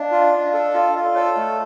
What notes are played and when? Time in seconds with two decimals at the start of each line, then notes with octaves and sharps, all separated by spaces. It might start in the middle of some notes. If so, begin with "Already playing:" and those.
Already playing: D4 D#5 F5
0.12 F4
0.19 D#5 F5
0.33 D4
0.47 D#5 F5
0.53 A4
0.74 F4 D#5 F5
0.96 F4
1.05 D5
1.15 A4 C#5 D#5
1.37 A3